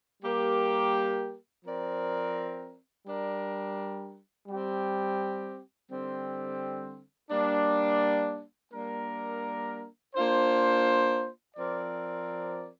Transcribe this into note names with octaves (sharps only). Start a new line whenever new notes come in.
G3 A#3 G4 A#4
F3 C4 A#4 D5
G3 D4 A#4
G3 C4 G4
D3 G3 C4
G3 A#3 D4
G3 A#3 D4 A#4
A#3 D4 F4 C5
F3 C4 A#4 D5